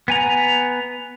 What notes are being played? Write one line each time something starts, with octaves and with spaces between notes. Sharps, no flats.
B3 G#5 A#5